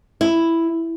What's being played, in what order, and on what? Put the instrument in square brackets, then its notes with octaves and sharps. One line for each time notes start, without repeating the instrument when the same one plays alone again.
[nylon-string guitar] E4